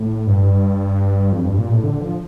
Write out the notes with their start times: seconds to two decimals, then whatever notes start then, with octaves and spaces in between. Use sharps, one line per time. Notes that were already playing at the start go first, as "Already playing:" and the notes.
Already playing: A2
0.27 G2
1.32 F2
1.45 G2
1.58 A#2
1.71 A2
1.84 D3
2.01 F3